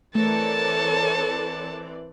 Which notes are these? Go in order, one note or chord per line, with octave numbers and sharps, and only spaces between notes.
E3 A3 C4 A4 A#4 C#5 D5 A5